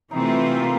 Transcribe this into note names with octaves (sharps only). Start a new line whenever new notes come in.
C3 E3 A3 C4 D#4 F4
A#3